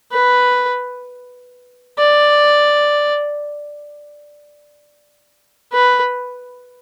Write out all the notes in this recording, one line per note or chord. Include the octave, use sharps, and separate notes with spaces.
B4
D5
B4